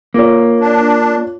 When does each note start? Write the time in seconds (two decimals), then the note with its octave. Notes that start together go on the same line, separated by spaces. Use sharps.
0.14 A#3 F4 C#5
0.60 D4